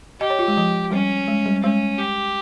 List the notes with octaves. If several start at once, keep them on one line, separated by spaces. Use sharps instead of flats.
G4 D#5
C#5
F4
G#3
F3
G3 C#4
G#3
G3
G#3 C#4
G4